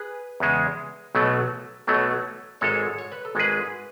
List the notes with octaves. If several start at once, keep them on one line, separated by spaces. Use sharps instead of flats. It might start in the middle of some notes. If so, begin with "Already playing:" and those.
Already playing: G#4 B4
E2 C#3 G#3
B1 B2 F#3 A3
B1 B2 F#3 A3
G#1 G#2 G#3 A4 C#5
C#5
B4
A4
G#1 G#2 G#3 G#4 B4